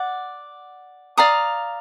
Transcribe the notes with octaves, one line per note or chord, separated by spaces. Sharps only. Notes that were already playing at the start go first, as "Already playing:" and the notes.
Already playing: D5 F#5
D5 F5 A#5 D#6